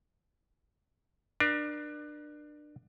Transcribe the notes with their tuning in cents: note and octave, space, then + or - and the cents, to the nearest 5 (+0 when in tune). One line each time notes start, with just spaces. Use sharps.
D4 +25 A#4 +40